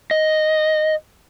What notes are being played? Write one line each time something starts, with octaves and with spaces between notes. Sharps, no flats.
D#5